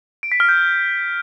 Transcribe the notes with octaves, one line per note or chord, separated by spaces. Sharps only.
D7
B6
F6
G6